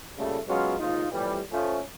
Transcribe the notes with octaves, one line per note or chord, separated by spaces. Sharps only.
A#2 C#3 G3 A3
F#3 G#3 B3 C#4 F4 F#4
D#2 G#2 D#4 F4
F2 A2 E3 G3
F3 A3 C#4